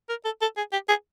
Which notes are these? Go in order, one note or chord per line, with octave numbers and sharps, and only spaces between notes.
A#4
A4
A4
G#4
G4
G#4